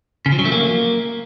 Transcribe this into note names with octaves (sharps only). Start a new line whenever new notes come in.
C#3
F3
F#3
A3
A#3